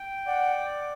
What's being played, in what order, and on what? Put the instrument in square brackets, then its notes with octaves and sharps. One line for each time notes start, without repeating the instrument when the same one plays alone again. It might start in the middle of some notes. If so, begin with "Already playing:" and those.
Already playing: [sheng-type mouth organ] G5
[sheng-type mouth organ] D5 [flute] F#5